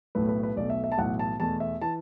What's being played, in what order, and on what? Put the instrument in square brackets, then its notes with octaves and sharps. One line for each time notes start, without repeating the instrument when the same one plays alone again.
[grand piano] B1 A2 A3 B4
B4
B4
B1 B2 A3 D5
E5
E5
A5
B1 A2 E3 F#5
A5
E2 B2 A3 A5
E5
E3 A5